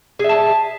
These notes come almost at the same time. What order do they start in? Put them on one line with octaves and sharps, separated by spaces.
G#4 E5 A5